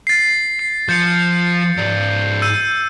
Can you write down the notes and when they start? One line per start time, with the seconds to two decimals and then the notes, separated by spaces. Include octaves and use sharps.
0.07 A6 C7
0.59 C7
0.89 F3 G6 A6 C#7
1.77 G#2 D5
2.42 E6 G6 D#7